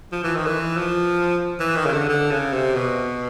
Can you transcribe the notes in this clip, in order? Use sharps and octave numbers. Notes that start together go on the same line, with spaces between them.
F3
E3
D#3
E3
F3
E3
D#3
C#3
D3
D3
C#3
C3
B2